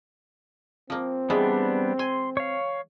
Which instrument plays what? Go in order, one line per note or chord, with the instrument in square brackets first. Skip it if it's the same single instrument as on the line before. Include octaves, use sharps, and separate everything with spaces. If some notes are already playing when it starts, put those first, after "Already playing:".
[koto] F3 A#3 [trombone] C4
[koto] E3 G#3 [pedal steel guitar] G3 B3 D4
[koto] G#5 [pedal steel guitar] C6
[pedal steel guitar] C#5 F5